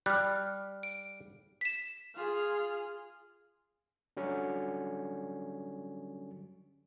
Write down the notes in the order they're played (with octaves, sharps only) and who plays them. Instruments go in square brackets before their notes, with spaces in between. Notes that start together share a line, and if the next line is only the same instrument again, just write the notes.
[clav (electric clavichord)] G3 [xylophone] F6 F#6
[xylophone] D7
B6 E7
[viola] F4 G#4
[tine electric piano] D3 F#3 G3 C#4